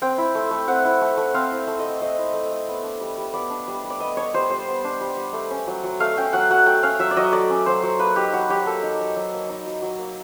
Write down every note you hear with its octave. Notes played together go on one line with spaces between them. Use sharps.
C4 G5
E4
A3
A3
C4 F#5
E4
A3
A3
C4 F5
E4
A3
D#5
A3
C4 D#5
E4
A3
A3
B3
D4
G3
G3
B3 D5
D4
G3
G3
D5
B3 D#5
D4 C#5
G3 C5
G3 C5
B3
D4
G3
G3
A3
C#4
F#3
F#3
A3 F5
C#4 G5
F#3 F#5
F#3 F#5
A3 G5
C#4 F5
F#3 E5
D5
F#3 D#5
A3 D5
C#4
F#3 C5
F#3
A#3 B4
D#4 G4
F#3 F#4
F#3 G4
A#3 A4
D#4
F#3
F#3
A#3
D#4
F#3
F#3
A#3